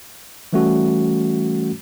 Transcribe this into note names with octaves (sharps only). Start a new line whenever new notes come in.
E3 G3 A3 C#4 F#4